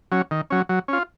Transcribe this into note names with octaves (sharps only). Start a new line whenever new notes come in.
F#3 C#4
D#3
F#3 C#4
F#3
C#4 F4